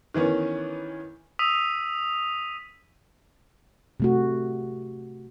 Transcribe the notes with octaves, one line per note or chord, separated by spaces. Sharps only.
D#3 E3 B3 C#4
D#6 E6 B6 D#7 F7
C3 A3 F#4